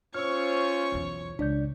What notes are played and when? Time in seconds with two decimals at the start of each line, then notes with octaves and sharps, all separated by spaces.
0.14 C#4 F4 C5 C#5 C#6 E6 F6
0.92 B1 E2
1.39 C#2 D4 D5 G6